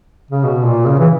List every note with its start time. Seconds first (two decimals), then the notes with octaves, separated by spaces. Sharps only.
0.31 C#3
0.43 B2
0.65 A#2
0.86 C#3
0.99 E3